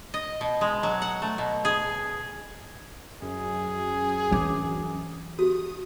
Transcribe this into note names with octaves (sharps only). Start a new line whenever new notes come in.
D#5
B2
G#3
F#3
F#5
A3
B2
G#4
F#2 G#4
E3 D4 C#5 G5 D6
F#4 G4 D#6